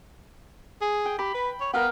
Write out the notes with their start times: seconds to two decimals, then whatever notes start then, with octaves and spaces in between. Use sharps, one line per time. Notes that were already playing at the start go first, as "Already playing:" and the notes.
0.81 G#4
1.05 G5
1.19 G4 B5
1.34 B4
1.61 C#5
1.73 B3 A#4 F5 G5